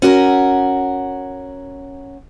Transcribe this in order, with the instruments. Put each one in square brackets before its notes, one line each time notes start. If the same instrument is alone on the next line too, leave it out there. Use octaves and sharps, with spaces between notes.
[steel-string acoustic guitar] C#4 F#4 A#4